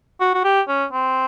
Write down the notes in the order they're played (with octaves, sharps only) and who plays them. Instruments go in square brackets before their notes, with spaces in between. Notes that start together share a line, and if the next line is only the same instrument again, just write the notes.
[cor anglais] F#4
F#4
G4
C#4
C4